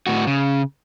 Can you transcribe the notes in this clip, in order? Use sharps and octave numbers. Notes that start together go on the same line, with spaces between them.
A2 F#4
C#3